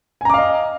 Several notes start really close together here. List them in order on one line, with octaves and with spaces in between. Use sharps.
G#5 A#5 D6 F5 D#5